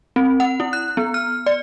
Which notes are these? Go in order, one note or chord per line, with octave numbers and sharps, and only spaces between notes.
C4
F#5
E4
F#6
B3
F6
D5